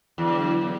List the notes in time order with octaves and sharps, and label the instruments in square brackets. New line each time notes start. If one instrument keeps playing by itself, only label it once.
[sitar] E2 [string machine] D3 F#3 B3 D4